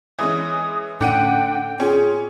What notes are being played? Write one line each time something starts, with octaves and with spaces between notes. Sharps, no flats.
E3 G#3 C#4 D#6
A2 D3 C#4 F#5 G5 D6 G6 D#7
C#4 F4 G#4